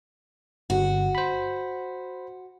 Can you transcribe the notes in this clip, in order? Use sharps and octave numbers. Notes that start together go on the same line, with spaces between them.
G1 F#4
C5 B5